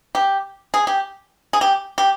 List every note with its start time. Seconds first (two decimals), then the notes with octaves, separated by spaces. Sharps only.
0.15 G4
0.74 G#4
0.87 G4
1.53 G#4
1.61 G4
1.98 G4